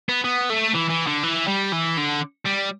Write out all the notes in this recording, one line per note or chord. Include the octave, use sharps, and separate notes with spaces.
B3
B3
A3
E3
E3
D3
E3
G3
E3
D3
G3